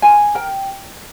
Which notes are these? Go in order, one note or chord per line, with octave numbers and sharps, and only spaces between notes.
F4 G#5
A#4 G5